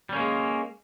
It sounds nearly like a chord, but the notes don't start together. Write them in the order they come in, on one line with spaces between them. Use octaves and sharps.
G3 C#4 A#3 G#3